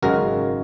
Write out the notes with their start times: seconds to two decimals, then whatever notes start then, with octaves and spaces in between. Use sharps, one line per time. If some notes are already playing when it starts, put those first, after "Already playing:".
0.02 G#1 F#2 C#3 G#3 F#4 A#4